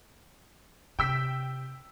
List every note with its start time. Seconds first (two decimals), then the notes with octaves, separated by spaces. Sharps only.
0.99 C3 G5 E6 B6